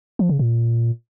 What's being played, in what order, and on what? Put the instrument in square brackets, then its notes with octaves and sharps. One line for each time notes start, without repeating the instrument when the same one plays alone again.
[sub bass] F3
C#3
A#2